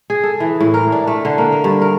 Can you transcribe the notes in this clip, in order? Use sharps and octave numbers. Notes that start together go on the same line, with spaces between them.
G#4
A4
E3
A2
A#4
D4
A3
D3
A#3
A#4
G2
A#4